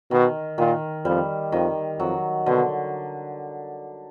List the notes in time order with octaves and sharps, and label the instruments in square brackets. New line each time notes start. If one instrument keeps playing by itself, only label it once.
[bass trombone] B2 [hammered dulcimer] D#3
[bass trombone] A#2 [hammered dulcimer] D#3
[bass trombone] F2 [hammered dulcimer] G3
[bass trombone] F2 [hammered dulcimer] D#3
[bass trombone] F2 [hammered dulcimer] F#3
[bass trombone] B2 [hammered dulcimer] D3